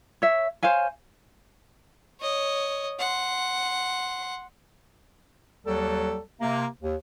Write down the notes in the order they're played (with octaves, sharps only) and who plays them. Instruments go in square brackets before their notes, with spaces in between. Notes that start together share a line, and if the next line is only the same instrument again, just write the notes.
[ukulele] C#5 E5
C5 C#5 F5 G#5
[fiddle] C#5 D#5
F#5 C6
[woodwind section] D#2 F#3 G3 A4
C3 A#3
D#2